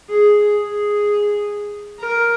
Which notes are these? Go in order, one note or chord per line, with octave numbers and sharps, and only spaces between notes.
G#4
G#4
A#4